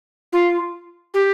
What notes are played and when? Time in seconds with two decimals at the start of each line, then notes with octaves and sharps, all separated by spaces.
0.32 F4
1.14 G4